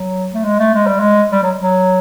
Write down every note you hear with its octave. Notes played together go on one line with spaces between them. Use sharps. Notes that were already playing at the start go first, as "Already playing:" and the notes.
Already playing: F#3
A3
G#3
A3
G#3
G3
G#3
G3
F#3
F#3